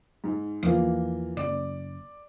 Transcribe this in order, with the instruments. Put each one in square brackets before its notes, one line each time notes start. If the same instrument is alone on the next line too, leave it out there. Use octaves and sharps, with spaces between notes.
[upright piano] G#2
[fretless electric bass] E2 F3 [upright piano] E3 A#3 F4
[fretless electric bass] F#1 [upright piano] D5